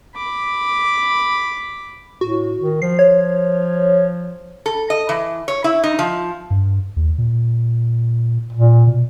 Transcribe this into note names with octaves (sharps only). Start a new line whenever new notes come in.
B5 D6
A2 F#4
D#3
F3 C7
C#5
A4
D#5
E3
C#5
E4
D#4
F3
G2
D#2
A#2
A#2
B2